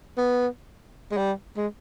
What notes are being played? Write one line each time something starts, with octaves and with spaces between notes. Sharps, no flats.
B3
G#3
G3
G#3